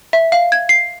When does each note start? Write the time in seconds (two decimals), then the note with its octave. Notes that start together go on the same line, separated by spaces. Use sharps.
0.13 E5
0.32 F5
0.52 G#6
0.69 C7